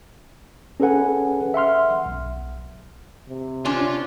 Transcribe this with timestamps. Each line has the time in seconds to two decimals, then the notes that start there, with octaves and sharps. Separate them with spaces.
0.80 C#4 G#4 A4 B4 F#5 G#5
1.54 E5 F#5 C6 F6
2.06 B1
3.29 C3
3.65 C#4 D4 F4 C6